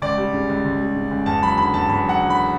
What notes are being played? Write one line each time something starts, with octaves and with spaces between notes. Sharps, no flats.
C#2 D5
G3
C#3
C#2
C#2
G3
C#3
C#2
E2 A5
F#3 B5
D3 B5
E2 A5
E2 B5
F#3
F#5
D3
B5